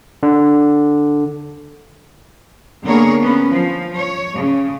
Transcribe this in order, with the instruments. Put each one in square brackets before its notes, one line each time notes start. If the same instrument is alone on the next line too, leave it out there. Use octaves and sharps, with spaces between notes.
[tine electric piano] D3
[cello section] D3 A#3 B3 G#4 A#4 C#5
A#3 B3 C#4
F3
C#5
C#3